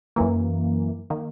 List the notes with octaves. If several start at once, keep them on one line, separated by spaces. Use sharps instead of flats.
F#2 E3 A#3
D#3 A#3